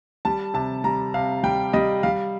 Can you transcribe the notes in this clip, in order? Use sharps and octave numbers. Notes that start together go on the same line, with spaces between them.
G3 A5
C3 A5
G3 A#5
C3 F5
G3 G5
G3 D#5
G3 F5